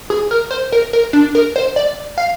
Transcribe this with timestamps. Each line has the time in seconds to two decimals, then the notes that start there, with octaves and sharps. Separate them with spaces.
0.10 G#4
0.31 A#4
0.51 C5
0.72 A#4
0.93 A#4
1.13 D4
1.35 A#4
1.56 C5
1.76 D5
2.18 F5